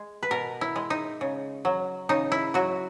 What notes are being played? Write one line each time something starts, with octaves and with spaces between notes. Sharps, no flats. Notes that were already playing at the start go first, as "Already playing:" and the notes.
Already playing: G#3
B4
B2 A#4
E4
G#3
D#4
C#3
F#3
C#3 D#4
E4
F#3 F#4